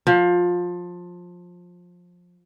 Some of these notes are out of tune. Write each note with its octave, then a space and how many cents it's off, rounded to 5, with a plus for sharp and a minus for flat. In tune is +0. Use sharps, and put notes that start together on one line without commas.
F3 +20